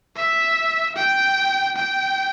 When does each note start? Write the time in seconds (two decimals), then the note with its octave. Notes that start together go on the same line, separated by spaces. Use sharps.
0.16 E5
0.96 G5
1.76 G5